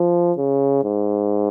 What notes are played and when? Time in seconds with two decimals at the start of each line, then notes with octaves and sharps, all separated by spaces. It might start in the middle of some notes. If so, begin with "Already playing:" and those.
Already playing: F3
0.38 C#3
0.84 G#2